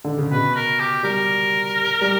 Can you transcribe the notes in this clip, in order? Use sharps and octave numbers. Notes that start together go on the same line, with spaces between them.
D3
C#3
B2 B4
A#4
G4
G3 A#4
G3